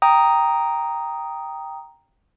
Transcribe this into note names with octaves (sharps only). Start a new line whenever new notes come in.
G5 A#5 D#6